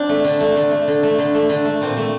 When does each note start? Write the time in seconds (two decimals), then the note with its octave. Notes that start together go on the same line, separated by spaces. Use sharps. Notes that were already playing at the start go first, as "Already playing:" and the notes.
Already playing: C4 D4
0.09 A3
0.24 D3
0.40 A3
0.56 D3
0.71 A3
0.88 D3
1.03 A3
1.18 D3
1.35 A3
1.49 D3
1.65 A3
1.81 A#2 C4
1.97 A3